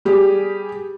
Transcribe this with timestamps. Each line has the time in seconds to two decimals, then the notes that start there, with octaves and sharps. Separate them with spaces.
0.05 G3 G4 G#4